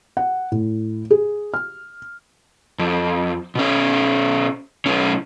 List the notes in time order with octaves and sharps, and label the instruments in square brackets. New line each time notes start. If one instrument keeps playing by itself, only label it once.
[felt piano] F#5
A2
G#4
F6
[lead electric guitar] F2
B2 C#4
B1 C#4